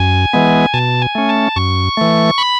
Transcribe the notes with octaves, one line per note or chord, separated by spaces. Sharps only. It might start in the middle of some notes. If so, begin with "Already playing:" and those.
Already playing: F#2 G#5
E3 G#3 B3
B2 A5
G#5
A3 C#4
A5
F#2 C#6
E3 A3
B5